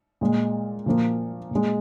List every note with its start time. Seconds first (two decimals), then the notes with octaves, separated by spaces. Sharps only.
0.21 A#2 G#3
0.86 A#2 F3 A#3
1.51 A#2 G#3